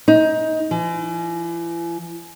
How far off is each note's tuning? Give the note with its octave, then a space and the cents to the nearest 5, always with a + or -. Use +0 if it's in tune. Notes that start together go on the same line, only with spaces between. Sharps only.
D#4 +20
E3 +40